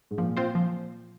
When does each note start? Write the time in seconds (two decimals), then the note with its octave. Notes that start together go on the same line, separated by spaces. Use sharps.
0.11 G#2
0.18 A#2 F3
0.37 C4 F4 C5
0.55 F3